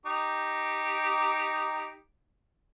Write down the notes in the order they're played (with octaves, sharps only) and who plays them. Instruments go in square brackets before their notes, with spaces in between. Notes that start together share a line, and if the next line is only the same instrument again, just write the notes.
[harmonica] D#4 G4 D6